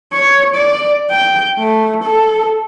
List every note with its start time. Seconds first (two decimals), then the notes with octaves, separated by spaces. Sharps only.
0.13 C#5
0.55 D5
1.10 G5
1.58 A3
2.03 A4